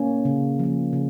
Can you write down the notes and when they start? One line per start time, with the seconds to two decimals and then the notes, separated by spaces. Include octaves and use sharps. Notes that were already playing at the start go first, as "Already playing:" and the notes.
Already playing: A#3 C#4
0.25 C#3
0.59 F3 A#3
0.93 C#3